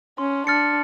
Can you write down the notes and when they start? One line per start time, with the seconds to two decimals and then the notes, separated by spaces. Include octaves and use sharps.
0.18 C#4 C6
0.47 D4 F6 A6 C#7